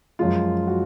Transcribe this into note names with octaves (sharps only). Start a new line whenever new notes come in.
F#2 F3 G#3 F4
F#4